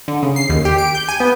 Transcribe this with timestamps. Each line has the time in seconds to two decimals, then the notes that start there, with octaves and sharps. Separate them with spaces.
0.08 D3
0.23 C#3
0.36 C7
0.49 D#2
0.65 G4
0.78 D7
0.95 G6
1.09 G#5
1.20 B3